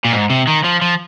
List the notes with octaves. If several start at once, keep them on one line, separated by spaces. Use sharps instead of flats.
A#2
G#2
C3
D#3
F3
F3